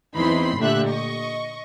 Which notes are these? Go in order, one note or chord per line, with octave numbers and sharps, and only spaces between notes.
E2 E3 C4 D#4 B5 C6
A#2 D3 A3 G4 E5 F#6
D#5 C#6